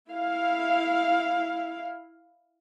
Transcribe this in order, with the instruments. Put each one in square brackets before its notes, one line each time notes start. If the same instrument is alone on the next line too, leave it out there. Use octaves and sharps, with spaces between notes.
[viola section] E4 F5